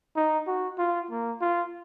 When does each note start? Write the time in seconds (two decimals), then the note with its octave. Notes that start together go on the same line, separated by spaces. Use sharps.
0.17 D#4
0.47 F#4
0.78 F4
1.11 A#3
1.41 F4